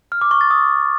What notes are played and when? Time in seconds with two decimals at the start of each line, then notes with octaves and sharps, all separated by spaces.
0.12 F6
0.21 D6
0.31 C#6
0.41 A6
0.51 D#6